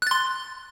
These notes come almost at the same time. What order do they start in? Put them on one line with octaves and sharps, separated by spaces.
F#6 A6 C6